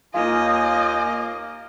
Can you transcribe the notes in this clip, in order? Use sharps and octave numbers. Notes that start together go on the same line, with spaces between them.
D#2 A#3 D#4 F4 D#5 G#5